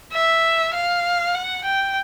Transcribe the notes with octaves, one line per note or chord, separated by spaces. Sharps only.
E5
F5
F#5
G5